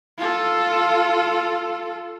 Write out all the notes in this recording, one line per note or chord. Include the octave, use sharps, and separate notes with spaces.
F4 A4